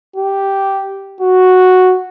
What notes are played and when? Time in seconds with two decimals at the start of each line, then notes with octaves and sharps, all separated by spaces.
0.16 G4
1.21 F#4